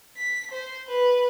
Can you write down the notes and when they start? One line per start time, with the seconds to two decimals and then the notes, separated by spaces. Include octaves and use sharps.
0.17 B6
0.52 C5
0.88 B4